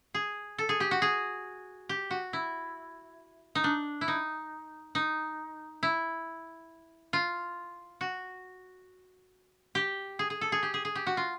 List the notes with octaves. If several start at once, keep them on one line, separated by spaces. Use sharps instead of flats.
G#4
A4
G#4
G4
F#4
G#4
G4
F#4
E4
D#4
D4
E4
D#4
D#4
E4
F4
F#4
G4
G#4
G#4
A4
G#4
G4
G#4
G#4
G4
F#4
F4